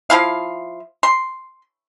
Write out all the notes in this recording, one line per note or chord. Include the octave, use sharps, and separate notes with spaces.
F3 E4 F5
C6